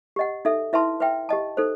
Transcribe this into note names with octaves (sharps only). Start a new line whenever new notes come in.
G4 D#5 F#5
D#4 A4 E5
E4 B4 E5 A5 C6
B4 E5 G5
G4 D#5 A5
D#4 A4 C5